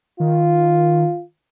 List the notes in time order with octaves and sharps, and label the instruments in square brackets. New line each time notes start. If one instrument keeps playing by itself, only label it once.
[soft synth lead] D#3 [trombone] F4